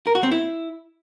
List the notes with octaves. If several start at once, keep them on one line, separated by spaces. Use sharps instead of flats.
A#4
F#4
C4
E4